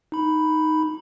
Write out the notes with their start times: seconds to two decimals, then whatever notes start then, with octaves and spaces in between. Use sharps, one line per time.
0.12 D#4 B5